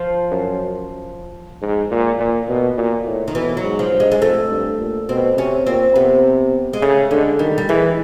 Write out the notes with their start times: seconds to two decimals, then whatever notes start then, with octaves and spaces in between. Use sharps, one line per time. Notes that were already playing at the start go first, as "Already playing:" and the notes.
Already playing: F3
0.31 F#2
1.62 G#2
1.91 A#2
2.20 A#2
2.49 B2
2.78 A#2
3.06 A2
3.28 D#3
3.35 B2 E3
3.57 F#3
3.64 G#2
3.79 F3
3.93 G2
4.00 G#3
4.12 G#3
4.22 F2 A3
4.51 G2
4.80 A#2
5.09 B2 C4
5.37 C3 C#4
5.66 A#2 C4
5.96 C3 B3
6.73 G#3
6.82 C#3 A3
7.11 D3 G#3
7.39 D#3 G3
7.58 G3
7.69 E3 G#3